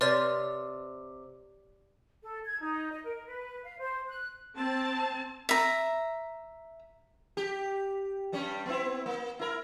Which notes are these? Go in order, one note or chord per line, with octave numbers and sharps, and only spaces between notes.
C3 B4 C#5 D5 F6 A6
A4
G#6
D#4
D#5
A#4
B4
F5
C5
F#6
C4 A5
E5 A#5
G4
G2 G3 C#4
B3 C4 E4
A#3
E4 A#4